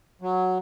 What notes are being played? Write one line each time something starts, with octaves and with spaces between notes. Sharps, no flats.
F#3